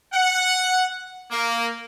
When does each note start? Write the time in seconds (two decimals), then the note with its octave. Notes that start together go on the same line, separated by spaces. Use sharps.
0.12 F#5
1.31 A#3